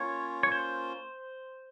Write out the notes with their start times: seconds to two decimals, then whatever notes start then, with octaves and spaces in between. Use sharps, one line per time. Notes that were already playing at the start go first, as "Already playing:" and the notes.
Already playing: A#3 C#4 F4 C#5
0.43 C#5
0.52 C5